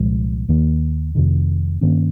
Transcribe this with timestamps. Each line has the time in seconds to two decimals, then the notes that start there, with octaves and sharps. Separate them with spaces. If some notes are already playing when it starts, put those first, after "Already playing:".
Already playing: C2 A#2 F3 G#3
0.48 D#2 D#3 A#3
1.15 F1 F2 C3 D#3
1.81 G2 D#3 A#3 C#4